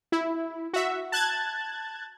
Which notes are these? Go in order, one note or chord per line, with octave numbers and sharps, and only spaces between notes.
E4
F#4 E5
A5 F#6 G#6 A6